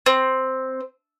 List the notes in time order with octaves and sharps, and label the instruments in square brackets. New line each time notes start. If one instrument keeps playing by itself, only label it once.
[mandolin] C4